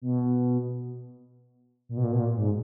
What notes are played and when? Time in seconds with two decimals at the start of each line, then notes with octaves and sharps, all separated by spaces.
0.02 B2
1.89 A#2
1.97 B2
2.04 A#2
2.12 B2
2.19 A#2
2.35 G#2